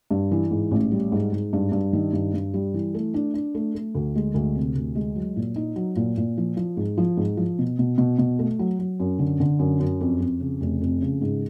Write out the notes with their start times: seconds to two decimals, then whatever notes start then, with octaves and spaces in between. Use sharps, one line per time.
0.11 G2
0.31 E3
0.51 G#2
0.71 A1
0.91 G3
1.12 G#2
1.33 G#2
1.53 G2
1.72 G2
1.93 D#3
2.13 G2
2.34 G2
2.54 G3
2.74 E3
2.94 A3
3.14 D4
3.34 D4
3.55 A3
3.75 A3
3.95 D2
4.15 G#3
4.34 D2
4.55 C3
4.76 D2
4.95 G#3
5.16 F#3
5.36 A#2
5.56 D#4
5.76 F#3
5.96 A#2
6.17 A#2
6.38 F3
6.57 F3
6.77 G#2
6.98 F3
7.17 G#2
7.37 F3
7.59 B2
7.79 B2
7.98 B2
8.18 B2
8.39 A3
8.59 F#3
8.79 F#3
9.00 F#2
9.19 D3
9.40 D3
9.59 F#2
9.80 F#2
10.01 F2
10.20 F2
10.40 C#3
10.61 F1
10.81 F2
11.01 C#3
11.21 G#2